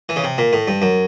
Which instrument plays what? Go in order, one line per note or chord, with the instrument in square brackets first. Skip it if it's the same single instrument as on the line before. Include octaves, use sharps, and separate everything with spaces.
[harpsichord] E3
C#3
C3
A#2
A2
G2
F#2